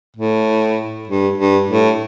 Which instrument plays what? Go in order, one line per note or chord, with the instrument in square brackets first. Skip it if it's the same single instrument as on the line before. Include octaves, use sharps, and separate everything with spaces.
[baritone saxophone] A2
G2
G2
A2